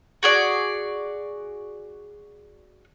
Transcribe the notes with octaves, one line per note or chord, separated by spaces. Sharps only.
F#4 G#4 D5